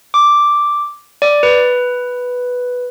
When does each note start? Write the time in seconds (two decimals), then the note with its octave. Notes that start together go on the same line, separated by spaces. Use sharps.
0.14 D6
1.22 D5
1.43 B4